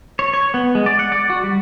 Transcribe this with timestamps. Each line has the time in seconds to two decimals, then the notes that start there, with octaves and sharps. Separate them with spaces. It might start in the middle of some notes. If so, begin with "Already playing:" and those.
0.19 C#5
0.33 C#5
0.54 B3
0.75 G#3
0.86 D5
0.99 F#5
1.12 D5
1.30 F#4
1.43 G3